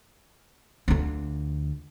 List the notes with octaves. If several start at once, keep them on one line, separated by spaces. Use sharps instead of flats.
D2 F4